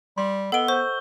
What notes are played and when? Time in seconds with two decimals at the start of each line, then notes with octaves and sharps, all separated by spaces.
0.18 G3 C6
0.52 B3 A4 B4 D#5 F#5 E6 D7 G7
0.68 C5 C#6 G6